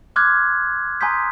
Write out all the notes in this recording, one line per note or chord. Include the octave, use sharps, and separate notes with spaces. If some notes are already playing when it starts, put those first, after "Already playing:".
C6 D6 F6 F#6 G#6
G#5 A#5 C6 D#6 G6 B6